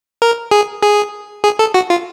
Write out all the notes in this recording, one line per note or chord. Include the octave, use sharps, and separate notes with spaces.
A#4
G#4
G#4
G#4
A4
F#4
F4